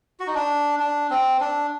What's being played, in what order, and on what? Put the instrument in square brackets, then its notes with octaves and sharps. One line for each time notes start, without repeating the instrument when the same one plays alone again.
[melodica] F#4
D#4
D4
D4
C4
D4